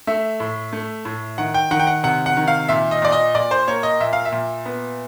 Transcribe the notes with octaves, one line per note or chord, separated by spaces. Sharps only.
A3 E5
A2
A3
A2
D#3 F#5
G5
D#3 F#5
G5
F#5
C3 F#5
F#5
D#3
F5
A#2 E5
D#5
A#2 D5
D#5
A#2 D5
C5
A#3 C#5
D#5
A#2 E5
F5
E5
A#2
B3